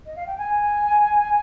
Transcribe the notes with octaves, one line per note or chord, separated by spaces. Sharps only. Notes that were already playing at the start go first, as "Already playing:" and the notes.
D#5
F5
G5
G#5